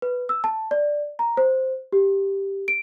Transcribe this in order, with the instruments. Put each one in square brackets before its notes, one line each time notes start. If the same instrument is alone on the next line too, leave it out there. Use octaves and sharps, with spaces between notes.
[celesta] B4
E6
A5
D5
A#5
C5
G4
D7